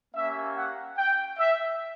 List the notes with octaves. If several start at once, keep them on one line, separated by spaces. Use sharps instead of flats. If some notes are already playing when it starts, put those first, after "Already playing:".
A#3 C#4 G4 E5
F#5
G5
E5